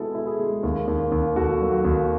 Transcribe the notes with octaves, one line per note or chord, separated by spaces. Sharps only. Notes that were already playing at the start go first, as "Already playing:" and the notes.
Already playing: G#3 B3 E4 F#4 G#4 A4
E4
G#4
G#3
D#2
D#2
D#2
D#2 F#4 A4
F#3
F#4
D#2